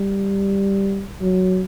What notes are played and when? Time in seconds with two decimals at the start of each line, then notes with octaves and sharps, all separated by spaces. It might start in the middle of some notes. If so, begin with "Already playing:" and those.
Already playing: G3
1.21 F#3